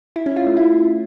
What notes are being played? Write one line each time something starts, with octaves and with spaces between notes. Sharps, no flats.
E4
C#4
F4
A3
E4